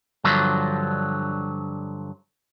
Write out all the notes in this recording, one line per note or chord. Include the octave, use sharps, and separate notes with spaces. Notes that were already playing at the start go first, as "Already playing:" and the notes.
G2 D3 F3 F#3